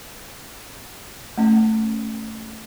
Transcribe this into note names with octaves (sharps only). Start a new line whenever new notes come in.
A3 C#4